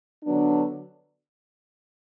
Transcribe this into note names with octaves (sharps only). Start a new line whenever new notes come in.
D3 F#3 B3 D4